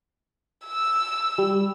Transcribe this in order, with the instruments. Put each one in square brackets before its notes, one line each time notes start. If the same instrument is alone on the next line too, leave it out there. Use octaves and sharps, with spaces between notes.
[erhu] E6
[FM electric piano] G3